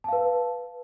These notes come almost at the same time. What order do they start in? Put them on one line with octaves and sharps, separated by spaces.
A5 F5 B4